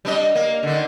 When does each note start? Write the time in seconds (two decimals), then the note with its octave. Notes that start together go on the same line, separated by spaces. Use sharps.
0.05 G3 D4 D#5
0.35 A#3
0.63 D3 D#3